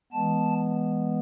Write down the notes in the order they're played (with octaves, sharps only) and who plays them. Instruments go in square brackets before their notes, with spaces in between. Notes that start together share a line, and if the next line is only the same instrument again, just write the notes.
[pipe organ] E3 G#3 B3 A5